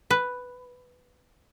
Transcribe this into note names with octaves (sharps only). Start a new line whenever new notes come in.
B4